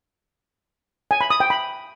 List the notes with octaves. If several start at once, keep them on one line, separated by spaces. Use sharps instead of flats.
G#5
B5
D#6
G5
B5